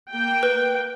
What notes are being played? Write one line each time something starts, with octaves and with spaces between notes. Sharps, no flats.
A#3 G5
B4